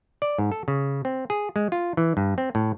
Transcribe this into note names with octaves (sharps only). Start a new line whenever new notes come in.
D5
G#2
A4
C#3
C4
G#4
G#3
F4
E3
G2
C4
A2